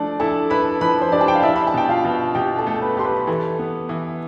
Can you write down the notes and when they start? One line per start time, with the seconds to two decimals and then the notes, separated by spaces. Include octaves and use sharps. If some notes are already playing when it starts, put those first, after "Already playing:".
Already playing: F3 A3 D4 D5
0.20 E4 A4 A5
0.50 E4 B4 B5
0.81 F3 B4 B5
1.02 C5
1.12 D4 G4 D5
1.21 A5
1.28 G5
1.35 F5
1.43 D4 E4 E5
1.56 B5
1.67 A5
1.74 B2 G5
1.89 F4 F5
2.05 B2
2.35 B2 G4 G5
2.58 A4 A5
2.67 A3
2.82 B4 B5
2.97 G4 C6
3.04 B4 B5
3.17 B5
3.27 E3 A4 A5
3.59 B3
3.89 E3